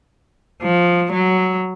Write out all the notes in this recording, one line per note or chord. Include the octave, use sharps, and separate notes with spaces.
F3
F#3